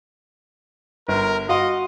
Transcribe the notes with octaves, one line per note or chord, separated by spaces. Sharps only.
G1 A#4
F#4 D#5 F5 C6